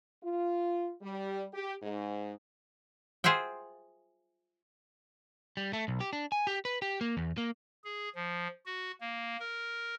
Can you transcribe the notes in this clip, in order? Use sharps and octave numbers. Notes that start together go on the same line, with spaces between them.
F4
G3
G4
G#2
F4 G#4 C5 E5 F#5 G5
G3
A3
B1
G4
D4
G#5
G4
B4
G4
A#3
E2
A#3
G#4
F3
F#4
A#3
A#4